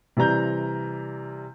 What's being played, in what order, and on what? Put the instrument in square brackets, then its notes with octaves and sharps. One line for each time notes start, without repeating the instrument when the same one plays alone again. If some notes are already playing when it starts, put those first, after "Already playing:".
[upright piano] C3 E3 G3 A#5 G6